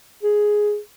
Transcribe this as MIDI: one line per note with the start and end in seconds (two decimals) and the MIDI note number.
0.23 0.78 68